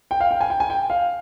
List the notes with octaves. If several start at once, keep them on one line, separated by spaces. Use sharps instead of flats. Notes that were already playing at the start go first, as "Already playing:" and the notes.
G5
F5
G5
G#5
G5
G#5
G5
F5